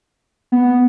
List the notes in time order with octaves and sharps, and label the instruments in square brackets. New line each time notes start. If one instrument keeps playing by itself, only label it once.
[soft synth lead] B3